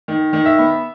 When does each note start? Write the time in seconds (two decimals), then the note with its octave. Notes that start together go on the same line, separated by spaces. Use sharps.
0.08 D#3
0.33 D#3
0.46 E5
0.58 B3